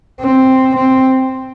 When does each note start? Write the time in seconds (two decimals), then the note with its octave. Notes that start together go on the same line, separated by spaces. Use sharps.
0.20 C4
0.77 C4